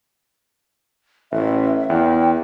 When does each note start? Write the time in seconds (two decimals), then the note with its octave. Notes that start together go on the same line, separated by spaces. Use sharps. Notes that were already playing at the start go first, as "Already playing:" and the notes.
1.32 A1 E5
1.89 E2 G5